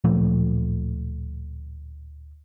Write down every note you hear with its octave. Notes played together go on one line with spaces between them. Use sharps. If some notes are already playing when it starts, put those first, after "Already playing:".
D1 A#2 F3 A3